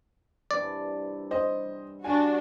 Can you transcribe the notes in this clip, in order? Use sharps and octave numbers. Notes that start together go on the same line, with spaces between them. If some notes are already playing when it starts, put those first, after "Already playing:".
G2 C3 E3 D5
C5 D#5
G3 D4 F#4 G4 G#5